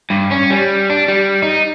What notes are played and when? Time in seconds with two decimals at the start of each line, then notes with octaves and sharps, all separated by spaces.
0.10 G2
0.31 C#4
0.51 G3
0.90 D4
1.08 G3
1.42 D#4